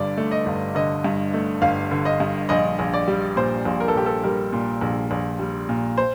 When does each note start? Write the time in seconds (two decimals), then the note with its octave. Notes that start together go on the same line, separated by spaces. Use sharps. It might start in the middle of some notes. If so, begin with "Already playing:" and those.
Already playing: G1 G2 D3 D5
0.17 A3
0.31 D#5
0.46 G1
0.75 D3 D#5
1.04 G2
1.34 A3
1.62 G1 F5
1.91 D3
2.05 D#5
2.20 G2
2.49 A#1 D#5
2.79 A#1
2.94 D5
3.08 G3
3.36 A#2 C5
3.65 A#1
3.80 A#4
3.88 A4
3.94 A#1 G4
4.06 A4
4.24 G3 A#4
4.53 A#2
4.81 A#1
5.11 A#1
5.39 G3
5.69 A#2
5.98 C5